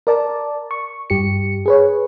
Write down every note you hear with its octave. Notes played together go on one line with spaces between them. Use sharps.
A#4 D5 A5
C#6
G2 G4 C#7
G#4 B4 C#5